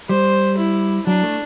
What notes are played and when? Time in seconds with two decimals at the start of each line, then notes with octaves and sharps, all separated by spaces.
0.09 G3 C5
0.57 E4
1.07 F#3 D4
1.23 A3